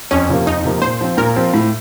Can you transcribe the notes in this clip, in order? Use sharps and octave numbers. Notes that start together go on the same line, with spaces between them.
F2 C#4
C3 F3 A#3
F2 D#4
C3 F3 A#3
A#2 C5
F3 C4
A#2 A#4
F3 C4
A2